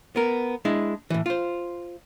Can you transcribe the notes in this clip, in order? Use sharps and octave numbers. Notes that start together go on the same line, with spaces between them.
B3 A#4
G#3 D4 E4
A2 E3
F4 C5